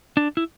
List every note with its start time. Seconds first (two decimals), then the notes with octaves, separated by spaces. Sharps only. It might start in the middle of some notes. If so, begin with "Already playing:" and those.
0.17 D4
0.37 E4